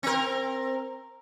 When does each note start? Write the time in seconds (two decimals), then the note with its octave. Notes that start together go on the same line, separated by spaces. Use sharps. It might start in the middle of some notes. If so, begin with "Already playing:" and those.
0.03 C4 A#4